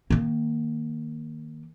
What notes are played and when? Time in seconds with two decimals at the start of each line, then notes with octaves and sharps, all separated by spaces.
0.10 D#3 A#3